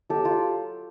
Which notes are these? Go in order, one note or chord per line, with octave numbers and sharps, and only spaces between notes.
F#3 G4 A4
F4 G4